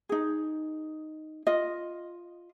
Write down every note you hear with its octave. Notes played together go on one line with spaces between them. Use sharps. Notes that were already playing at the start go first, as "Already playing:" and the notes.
D#4 G#4
F4 D#5